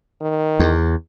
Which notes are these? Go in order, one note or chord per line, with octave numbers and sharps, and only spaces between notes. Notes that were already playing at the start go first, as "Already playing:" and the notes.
D#3
E2